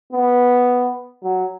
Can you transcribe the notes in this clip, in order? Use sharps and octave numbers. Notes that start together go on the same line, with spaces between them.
B3
F#3